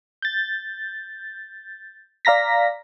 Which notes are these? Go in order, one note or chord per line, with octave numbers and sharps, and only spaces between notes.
G6 A6
D5 F5 A#5 A#6 B6